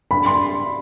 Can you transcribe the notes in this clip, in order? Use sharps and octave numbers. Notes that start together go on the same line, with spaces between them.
B5
C6